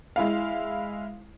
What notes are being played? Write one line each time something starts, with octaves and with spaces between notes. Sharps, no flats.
G#3 E4 F5